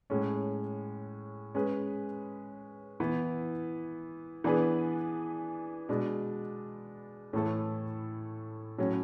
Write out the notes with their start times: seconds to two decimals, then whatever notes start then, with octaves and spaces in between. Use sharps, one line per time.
0.10 A2 G#3 C#4
1.55 G#3 C#4 G#4 B4
3.00 E3 B3 E4
4.44 E3 B3 D4 G#4 B4
5.89 B2 G#3 D4
7.33 A2 E3 A3 E4 A4
8.78 A2 F#3 C#4